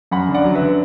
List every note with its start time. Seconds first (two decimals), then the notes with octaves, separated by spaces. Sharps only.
0.11 F#2 F#5 B5
0.29 D3
0.34 D5 F#5
0.44 F#3
0.55 B4 E5
0.62 D3